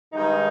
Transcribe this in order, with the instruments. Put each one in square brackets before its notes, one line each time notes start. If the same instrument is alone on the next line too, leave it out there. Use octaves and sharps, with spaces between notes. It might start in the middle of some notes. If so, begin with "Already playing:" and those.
[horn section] G2 D#3 G#3 D#4